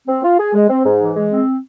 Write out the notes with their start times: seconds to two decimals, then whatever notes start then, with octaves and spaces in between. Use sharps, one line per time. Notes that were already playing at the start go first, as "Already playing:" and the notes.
0.08 C4
0.24 F4
0.39 G#4
0.54 G#3
0.69 C4
0.85 G#2
1.01 E3
1.16 G#3
1.31 C4